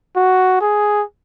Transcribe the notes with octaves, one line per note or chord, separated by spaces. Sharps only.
F#4
G#4